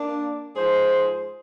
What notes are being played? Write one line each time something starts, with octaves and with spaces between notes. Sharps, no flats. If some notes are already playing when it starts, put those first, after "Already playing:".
Already playing: A#3 D4
G#2 F3 G#4 C5